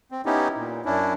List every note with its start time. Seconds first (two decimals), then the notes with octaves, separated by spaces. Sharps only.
0.12 C4
0.26 B3 C#4 D#4 E4 G4
0.56 A#2
0.85 F#2 C#4 D4 E4